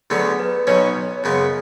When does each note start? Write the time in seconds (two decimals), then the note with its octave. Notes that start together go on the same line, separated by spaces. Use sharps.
0.10 D2 D3 F#3 B3 G#4
0.40 B4
0.67 B1 B2 F#3 C#4 C#5
1.24 F#2 C#3 G#3 B3 C#5